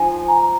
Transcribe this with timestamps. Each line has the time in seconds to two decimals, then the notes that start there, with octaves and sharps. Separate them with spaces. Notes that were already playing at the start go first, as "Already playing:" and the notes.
Already playing: F3 D#4 G#5
0.27 A#5